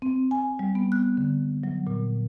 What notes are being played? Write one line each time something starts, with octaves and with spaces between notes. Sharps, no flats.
C4
G#5
G3
B3
F#6
D3
F#3
A#2